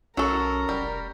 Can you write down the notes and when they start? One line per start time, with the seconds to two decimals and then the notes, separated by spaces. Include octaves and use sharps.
0.17 B1 F#3 C#4 A4 A#4 C#6
0.69 F1 G3